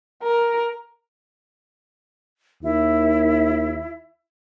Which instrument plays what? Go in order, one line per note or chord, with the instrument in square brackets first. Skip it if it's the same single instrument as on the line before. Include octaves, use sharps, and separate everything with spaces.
[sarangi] A#4
[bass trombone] D#2 [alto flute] E4